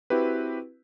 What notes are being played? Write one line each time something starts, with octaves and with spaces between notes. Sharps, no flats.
C4 E4 F#4 G4 B4